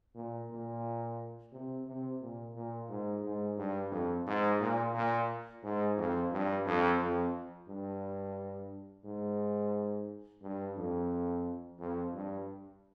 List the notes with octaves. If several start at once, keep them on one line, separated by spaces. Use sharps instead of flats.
A#2
A#2
C3
C3
A#2
A#2
G#2
G#2
G2
F2
G#2
A#2
A#2
G#2
F2
G2
F2
F2
G2
G#2
G2
F2
F2
G2